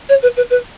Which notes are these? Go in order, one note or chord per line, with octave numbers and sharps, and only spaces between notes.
C#5
B4
B4
B4